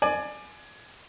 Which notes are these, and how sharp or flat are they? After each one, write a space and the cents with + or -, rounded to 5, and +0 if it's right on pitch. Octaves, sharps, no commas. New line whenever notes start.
D5 +25 G#5 +20